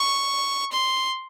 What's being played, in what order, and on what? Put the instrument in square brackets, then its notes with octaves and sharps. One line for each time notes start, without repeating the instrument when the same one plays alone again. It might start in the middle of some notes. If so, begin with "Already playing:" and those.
Already playing: [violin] C#6
C6